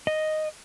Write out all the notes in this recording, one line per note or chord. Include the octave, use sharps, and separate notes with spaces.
D#5